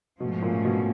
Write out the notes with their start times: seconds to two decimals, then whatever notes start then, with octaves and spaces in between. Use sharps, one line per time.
0.20 G#2 B2 F3 A3 C#4
0.42 A#2
0.65 B2